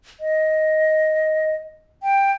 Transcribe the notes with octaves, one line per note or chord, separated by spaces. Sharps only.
D#5
G5